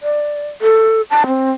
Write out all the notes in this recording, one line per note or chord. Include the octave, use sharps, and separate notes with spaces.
D5
A4
A5
C4